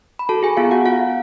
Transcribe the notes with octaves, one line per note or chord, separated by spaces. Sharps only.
B5
F#4 A4 A5
G#4 G#5
B3 F4 F5
F#4 F#5
F4 F5